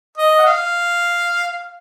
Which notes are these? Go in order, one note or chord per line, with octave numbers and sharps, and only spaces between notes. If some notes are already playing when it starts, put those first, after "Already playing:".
D#5
F#5
F5